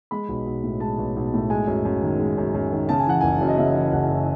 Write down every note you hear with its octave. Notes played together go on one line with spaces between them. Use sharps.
G#3 B5
B1
B1
A2
G#3 A5
B1
B1
A2
G#3 G#5
F#2
F#2
D#3
G#3
F#2
F#2
D#3
C#3 A5
G#5
E3 F#5
F#1 G#5
F#2
D#5
C#3 E5
E3
F#1 F#5
F#2